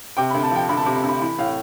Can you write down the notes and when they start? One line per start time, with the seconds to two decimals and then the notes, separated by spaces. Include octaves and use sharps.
0.17 C3 G5
0.30 D2 B5
0.43 A5
0.51 F3 G5
0.69 D2 B5
0.77 A5
0.82 C3 B5
0.96 B5
1.04 D2
1.09 B5
1.21 E3 B5
1.39 A2 F5